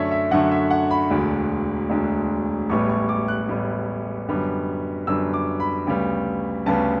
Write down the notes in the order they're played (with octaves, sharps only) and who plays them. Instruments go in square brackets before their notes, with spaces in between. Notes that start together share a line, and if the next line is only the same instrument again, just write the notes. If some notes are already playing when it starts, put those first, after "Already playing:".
Already playing: [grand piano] F#2 D3 A3 C#5 D5 E5
E5
F#2 D3 A3 F#5
E5
F#5
B5
E1 D2 D3
E1 D2 D3
A1 A2 G3 B3 C#6
C#6
D6
F#6
A1 A2 G3 B3
F#2 D3 G3 B3
F#2 D3 G3 B3 E6
D6
B5
D2 C#3 G3 B3
D2 C#3 G3 B3 A5